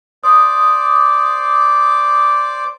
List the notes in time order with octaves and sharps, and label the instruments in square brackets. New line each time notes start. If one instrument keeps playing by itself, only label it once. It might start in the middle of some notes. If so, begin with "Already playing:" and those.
[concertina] C5 D5 D6 [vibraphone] D#6